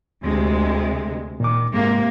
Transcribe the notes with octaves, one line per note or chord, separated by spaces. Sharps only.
D2 C3 G#3
A#2 D#3 D6
G#2 C3 G#3 A#3